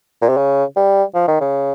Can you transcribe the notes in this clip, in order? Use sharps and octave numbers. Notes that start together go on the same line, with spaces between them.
A#2
C3
C#3
G3
F3
D#3
C#3